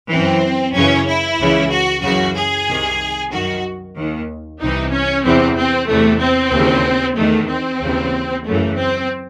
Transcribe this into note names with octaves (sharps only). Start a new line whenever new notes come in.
F#2 E3 C4
F#2 C#3 E3 C#4
E4
C#2 C#3 E3
F#4
F#2 C#3 E3 F#4
G#4
C2 C3 D#3
F#2 D#3 F#4
D#2 D#3
C2 C3 E3 D#4
C#4
E2 C3 E3 C4
C4
E2 C3 E3 A3
C4
D#2 C#3 E3
E2 D#3 A3
C4
D#2 C#3 E3
F#2 C#3 E3 A3
C4